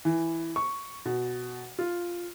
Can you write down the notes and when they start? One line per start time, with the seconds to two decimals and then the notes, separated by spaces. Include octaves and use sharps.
0.05 E3
0.56 C#6
1.05 B2
1.79 F4